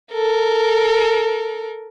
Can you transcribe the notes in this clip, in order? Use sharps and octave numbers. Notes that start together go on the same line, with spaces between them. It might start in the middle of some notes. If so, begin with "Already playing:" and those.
A4 A#4